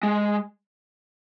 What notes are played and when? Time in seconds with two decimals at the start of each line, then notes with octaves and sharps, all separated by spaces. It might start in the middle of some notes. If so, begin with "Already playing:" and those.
0.03 G#3